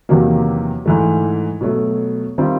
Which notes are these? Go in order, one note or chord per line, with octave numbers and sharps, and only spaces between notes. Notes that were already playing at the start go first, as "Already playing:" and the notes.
E2 C3 D#3 F#3 A#3
G#2 E3 A3
B2 F#3 A3
D#3 G3 C4 F4